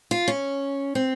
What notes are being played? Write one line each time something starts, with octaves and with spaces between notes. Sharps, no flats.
F4
C#4
C4